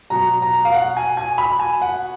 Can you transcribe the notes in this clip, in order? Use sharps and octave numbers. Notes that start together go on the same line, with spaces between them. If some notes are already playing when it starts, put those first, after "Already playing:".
B2 F#3 A#5
A#5
F5
F#5
G#5
G#5
B5
G#5
F#5